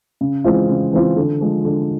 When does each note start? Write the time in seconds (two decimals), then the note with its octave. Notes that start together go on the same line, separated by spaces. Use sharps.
0.21 C#3
0.44 E3 G#3 C4 F4
0.69 C#3
0.93 E3 G#3 C4 F4
1.16 D3
1.41 F3 G#3
1.65 D3